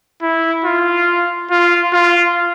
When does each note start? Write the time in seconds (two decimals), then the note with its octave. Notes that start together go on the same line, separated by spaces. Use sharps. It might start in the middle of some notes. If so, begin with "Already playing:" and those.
0.22 E4
0.65 F4
1.51 F4
1.93 F4